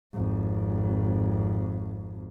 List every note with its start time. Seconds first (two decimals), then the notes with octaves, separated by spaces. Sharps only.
0.14 G#1 F2